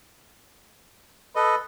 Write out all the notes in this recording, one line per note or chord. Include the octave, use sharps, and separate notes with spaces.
A4 B4 D#5